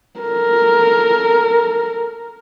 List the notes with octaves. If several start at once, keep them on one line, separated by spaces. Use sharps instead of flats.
A4 A#4